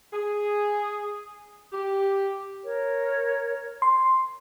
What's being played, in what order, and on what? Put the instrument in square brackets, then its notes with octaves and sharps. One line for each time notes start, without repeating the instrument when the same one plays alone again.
[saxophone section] G#4
G4
[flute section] A#4 C#5
[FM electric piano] C6